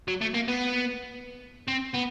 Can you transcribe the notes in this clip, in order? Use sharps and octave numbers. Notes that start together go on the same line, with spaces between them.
F#3
A3
A#3
B3
C4
B3